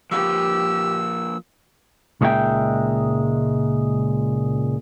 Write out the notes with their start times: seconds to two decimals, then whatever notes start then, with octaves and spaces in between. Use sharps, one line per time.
0.11 F3 A#3 G4 B4 E6
2.21 C#2 A#2 G#3 D#4 E5 G5